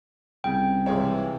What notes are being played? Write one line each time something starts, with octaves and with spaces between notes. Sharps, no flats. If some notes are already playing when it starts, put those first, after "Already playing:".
C2 C#3 G5
C3 E3 G#3 F4 C#5